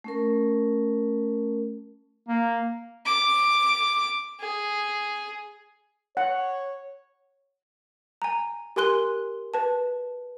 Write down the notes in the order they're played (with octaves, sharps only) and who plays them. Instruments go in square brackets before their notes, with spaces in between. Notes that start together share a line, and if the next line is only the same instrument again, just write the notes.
[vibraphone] A3 C#4 A#4
[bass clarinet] A#3
[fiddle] D6
G#4
[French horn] C#5 [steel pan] F#5
[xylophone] G#5 A#5
G4 A#4 G#5 C6 F#6 G7
B4 A5